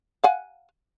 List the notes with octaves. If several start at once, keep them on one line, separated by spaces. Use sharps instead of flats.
F5 F#5 G#5